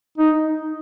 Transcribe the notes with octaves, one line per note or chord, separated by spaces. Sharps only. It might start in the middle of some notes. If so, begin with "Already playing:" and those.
D#4